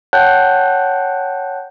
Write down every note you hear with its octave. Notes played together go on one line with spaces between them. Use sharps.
C#5 F#5 G5 A5 F#6 G6